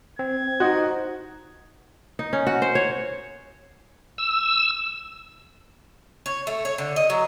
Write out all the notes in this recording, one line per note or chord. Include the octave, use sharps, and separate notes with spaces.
C4 G#6
D#4 F#4 C5 D#5
D#4
C#4
F#4
C5
C#5
E6
C#5
A3
C#5
D3
D#5
F#3